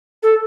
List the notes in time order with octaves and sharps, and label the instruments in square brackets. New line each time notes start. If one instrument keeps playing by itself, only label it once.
[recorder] A4